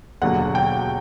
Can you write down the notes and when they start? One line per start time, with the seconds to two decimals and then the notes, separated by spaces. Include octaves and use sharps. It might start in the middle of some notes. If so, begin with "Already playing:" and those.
0.22 E1 D#2 D3 F#3 F#5
0.55 G5